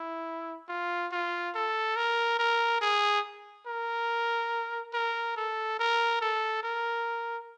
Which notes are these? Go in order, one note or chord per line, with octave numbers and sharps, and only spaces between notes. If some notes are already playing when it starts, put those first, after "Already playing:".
Already playing: E4
F4
F4
A4
A#4
A#4
G#4
A#4
A#4
A4
A#4
A4
A#4